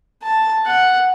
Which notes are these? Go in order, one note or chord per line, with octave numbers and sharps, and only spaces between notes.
A5
F#5